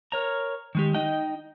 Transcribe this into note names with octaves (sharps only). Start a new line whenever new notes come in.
A#4 C#5 A#5
D#3 G#3 G4
D#4 D#5 G5